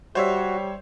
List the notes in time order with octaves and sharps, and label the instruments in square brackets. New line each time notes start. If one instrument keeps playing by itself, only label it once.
[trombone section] G3 [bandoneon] F#4 [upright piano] C5 C#5 E5